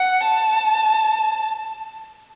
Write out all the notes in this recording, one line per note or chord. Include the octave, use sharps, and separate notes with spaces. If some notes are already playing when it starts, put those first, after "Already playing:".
Already playing: F#5
A5